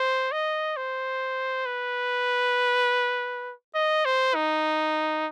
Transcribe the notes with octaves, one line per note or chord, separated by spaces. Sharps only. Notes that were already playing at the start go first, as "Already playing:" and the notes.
Already playing: C5
D#5
C5
B4
D#5
C5
D#4